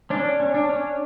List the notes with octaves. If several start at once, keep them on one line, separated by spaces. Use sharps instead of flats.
C#4 D4
C#4
D4
C#4